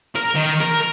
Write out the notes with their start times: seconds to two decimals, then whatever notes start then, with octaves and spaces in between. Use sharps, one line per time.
0.15 A#4
0.35 D#3
0.61 A#4